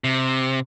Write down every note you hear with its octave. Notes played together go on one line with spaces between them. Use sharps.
C3